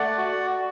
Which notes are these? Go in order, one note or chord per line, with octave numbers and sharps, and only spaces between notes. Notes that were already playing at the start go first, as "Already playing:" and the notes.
Already playing: A3 D5 F#5
F#4